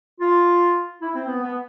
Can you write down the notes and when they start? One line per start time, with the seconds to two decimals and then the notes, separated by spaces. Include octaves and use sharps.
0.20 F4
1.01 E4
1.14 C4
1.28 B3
1.42 B3